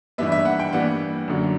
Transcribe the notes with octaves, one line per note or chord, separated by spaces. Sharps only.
G2 E3 G3 B3 E5
E5
F#5
G5
G2 E3 G3 B3 F#5
F#2 D3 F#3